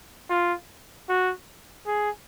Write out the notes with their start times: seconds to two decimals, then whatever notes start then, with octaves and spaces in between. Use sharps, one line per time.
0.30 F4
1.09 F#4
1.87 G#4